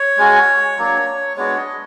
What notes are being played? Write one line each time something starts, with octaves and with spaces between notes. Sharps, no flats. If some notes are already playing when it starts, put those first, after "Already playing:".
Already playing: C#5
G#3 C#4 F#4
F#3 A#3 D4
G#3 B3 D4 F#4 C#5
D#5